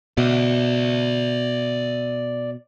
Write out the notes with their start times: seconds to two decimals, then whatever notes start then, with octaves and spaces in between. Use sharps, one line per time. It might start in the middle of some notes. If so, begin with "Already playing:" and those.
0.18 B2 D5 E5